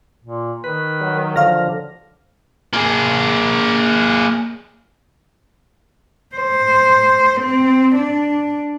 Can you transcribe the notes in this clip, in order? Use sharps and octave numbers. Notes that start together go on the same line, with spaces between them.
A#2
D#3 B4
F#3
D3 F3 F5 F6 A#6
A#3 G#4
C5
C4
D4